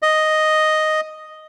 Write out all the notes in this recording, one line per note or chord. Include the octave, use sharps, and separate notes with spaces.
D#5